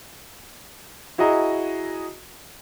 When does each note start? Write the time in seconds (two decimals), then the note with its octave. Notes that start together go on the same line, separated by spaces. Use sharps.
1.18 E4 F#4 G#4 D#5 A#5